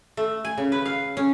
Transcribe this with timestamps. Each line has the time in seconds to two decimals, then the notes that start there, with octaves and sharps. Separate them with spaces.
0.17 A3
0.45 G#5
0.58 C#3
0.72 B4
0.85 F5
1.17 C#4